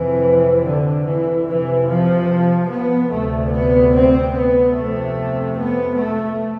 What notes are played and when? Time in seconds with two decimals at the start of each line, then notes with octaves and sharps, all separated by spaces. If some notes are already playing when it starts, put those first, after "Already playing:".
Already playing: F2 C3 E3
0.65 D3
1.06 E3
1.47 F2 C3 E3
1.88 F3
2.70 B3
3.11 D2 C3 A3
3.52 B3
3.93 C4
4.34 B3
4.75 F2 C3 A3
5.58 B3
5.98 A3